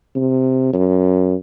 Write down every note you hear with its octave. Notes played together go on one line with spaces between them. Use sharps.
C3
F#2